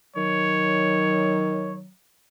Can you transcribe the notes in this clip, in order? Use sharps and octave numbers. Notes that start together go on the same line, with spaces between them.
D#3 F#3 C#5